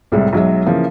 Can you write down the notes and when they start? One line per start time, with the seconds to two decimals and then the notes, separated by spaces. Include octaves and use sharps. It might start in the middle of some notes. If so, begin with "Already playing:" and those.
0.12 C2 A2 C3 G3 G#3
0.33 B1 F#3 G#3 E5
0.66 C#3 E3 F3 A#3